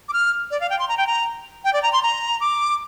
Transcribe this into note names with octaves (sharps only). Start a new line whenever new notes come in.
D6
F6
D5
F5
G5
C6
A#5
G5
A#5
G5
D5
A#5
C6
A#5
D6